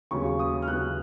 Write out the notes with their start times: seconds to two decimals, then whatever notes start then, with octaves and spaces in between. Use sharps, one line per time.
0.11 D#2 C#3 F#3 B3 C#6
0.39 D#6
0.62 F6
0.68 D#2 C#3 F#3 B3 F#6